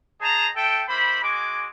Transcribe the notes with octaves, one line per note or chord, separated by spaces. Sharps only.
G#4 C5 D#5 A5 A#5
A4 E5 G5
A#3 E4 C5 B5
G#3 F#4 G#5 D6